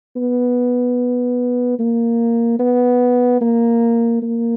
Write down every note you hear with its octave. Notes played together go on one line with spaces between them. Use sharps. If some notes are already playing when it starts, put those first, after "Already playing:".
B3
A#3
B3
A#3
A#3